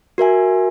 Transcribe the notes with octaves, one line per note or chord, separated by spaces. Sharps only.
F#4 A#4 E5 G#5